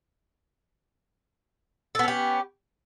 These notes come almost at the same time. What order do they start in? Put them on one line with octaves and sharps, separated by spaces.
A4 B3 C#4 G4